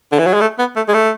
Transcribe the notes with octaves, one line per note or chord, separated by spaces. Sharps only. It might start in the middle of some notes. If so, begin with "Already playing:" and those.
D3
E3
F#3
G#3
A3
B3
A3
G#3
A3